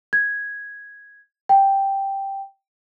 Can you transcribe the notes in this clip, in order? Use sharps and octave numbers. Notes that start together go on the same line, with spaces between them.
G#6
G5